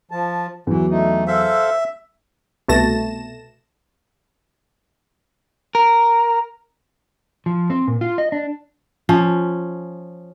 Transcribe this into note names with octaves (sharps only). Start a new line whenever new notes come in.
F3 A5
E2 E3 F#3
A3 D#4
A4 C5 E5 F5
C2 B2 A3 A5 A#6 E7
A#4
F3
C4
A#2
F4
D#5
D4
F3 C#4